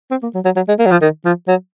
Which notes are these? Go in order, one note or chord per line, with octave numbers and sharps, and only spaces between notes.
C4
A#3
F#3
F#3
F#3
G#3
A#3
F#3
F3
D#3
F3
F#3